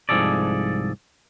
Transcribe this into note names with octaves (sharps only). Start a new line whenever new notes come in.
C2 G#2 F3 G#4 A4 D5